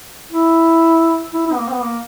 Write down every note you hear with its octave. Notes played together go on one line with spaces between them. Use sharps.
E4
E4
E4
B3
A#3
C4
B3
A#3